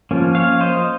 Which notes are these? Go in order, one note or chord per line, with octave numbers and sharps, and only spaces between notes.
F3 A#3 C#4
C#5 F5
C5 D#5